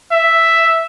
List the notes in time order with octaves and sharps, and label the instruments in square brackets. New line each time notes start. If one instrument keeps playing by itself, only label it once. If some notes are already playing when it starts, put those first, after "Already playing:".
[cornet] E5